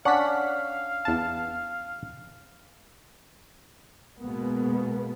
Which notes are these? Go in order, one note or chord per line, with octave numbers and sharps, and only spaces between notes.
C#4 D4 F5 F#5 B6
E2 A5
B2 G#3 A#3 B3